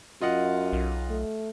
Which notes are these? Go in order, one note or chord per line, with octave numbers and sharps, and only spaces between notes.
F#2 F4 D#5 F#5
B1
A3